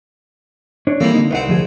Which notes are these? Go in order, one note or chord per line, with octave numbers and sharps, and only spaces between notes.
D4 C#5
E3 G3 A#3 C4 A4
D3 D#4
C2 C4 B4 F5 F#5
D2 F3 G#4